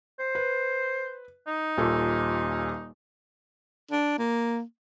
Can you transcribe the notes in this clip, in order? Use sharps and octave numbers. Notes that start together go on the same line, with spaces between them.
C5
B4
D#4
D#1 A#2 A4
D4
A#3